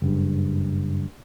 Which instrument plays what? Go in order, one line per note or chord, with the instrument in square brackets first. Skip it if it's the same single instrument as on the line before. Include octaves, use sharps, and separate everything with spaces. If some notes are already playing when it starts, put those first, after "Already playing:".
[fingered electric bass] F#1 G2